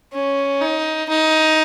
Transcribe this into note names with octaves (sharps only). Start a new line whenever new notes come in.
C#4
D#4
D#4